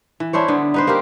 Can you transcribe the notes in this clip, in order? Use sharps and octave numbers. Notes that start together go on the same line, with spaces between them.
E3
D4 E4 C5 C#5
D3 B3
D#4 B4 C5
A#3 C4 G4 A#4